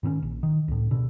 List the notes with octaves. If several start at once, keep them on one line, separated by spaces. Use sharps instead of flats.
G#2 D#3 C4 C#4
A#1
D#3
C#2 A2
B2 D3